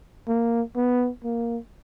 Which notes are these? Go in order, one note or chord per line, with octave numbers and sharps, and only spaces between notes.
A#3
B3
A#3